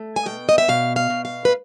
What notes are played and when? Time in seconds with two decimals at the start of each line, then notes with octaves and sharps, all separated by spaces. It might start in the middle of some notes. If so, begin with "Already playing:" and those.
Already playing: A3
0.16 G#5
0.26 B2 G5
0.49 D#5
0.58 E5
0.68 B2 F5
0.96 F5
1.10 B2
1.25 F5
1.45 B4